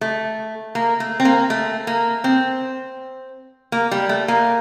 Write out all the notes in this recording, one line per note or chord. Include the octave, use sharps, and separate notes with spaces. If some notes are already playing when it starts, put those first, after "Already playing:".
A3
A#3
A3
C4
A#3
A3
A#3
C4
A#3
G3
A3
A#3